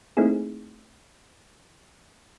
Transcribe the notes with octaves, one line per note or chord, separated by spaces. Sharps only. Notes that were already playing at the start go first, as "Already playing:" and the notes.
A3 A#3 C4 D#4 E4 G#4